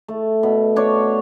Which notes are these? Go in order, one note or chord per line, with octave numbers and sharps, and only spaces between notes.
A3
B2
D4 C#5